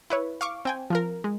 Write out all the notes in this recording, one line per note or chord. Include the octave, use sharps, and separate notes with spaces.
E4 B4 C#5
F5 C#6 D6
C4 G5 G#5
F3 F4 A#4
G#3